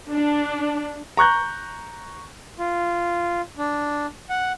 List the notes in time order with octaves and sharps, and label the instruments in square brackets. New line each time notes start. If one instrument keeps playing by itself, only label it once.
[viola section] D4
[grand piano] A#5 C#6 F#6 G6
[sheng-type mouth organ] F4
D4
F#5